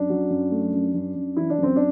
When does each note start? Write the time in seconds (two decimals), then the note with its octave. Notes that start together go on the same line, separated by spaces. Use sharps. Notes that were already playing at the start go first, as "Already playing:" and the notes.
Already playing: F#2 D4
0.10 F#3
0.30 F#2
0.51 A3
0.74 F#2
0.94 F#2
1.15 F#2
1.37 E3 E4
1.50 D4
1.58 F#2 C4
1.76 D4